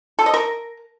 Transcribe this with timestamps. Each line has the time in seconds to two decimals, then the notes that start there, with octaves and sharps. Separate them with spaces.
0.19 A4
0.26 D#5
0.34 A#4